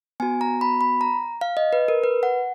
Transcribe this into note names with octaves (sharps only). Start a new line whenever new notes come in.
B3 F#4 G#5
A#5
B5
B5
A#5
F5
D#5
B4
A#4
B4
F#5